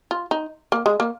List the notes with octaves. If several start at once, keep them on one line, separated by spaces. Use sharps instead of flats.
F4
D#4
A#3
G#3
A#3